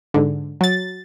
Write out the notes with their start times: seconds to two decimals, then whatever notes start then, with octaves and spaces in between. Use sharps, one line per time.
0.14 G#2 D3
0.61 F#3 A6